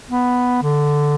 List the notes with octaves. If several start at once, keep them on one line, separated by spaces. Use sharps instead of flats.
B3
D3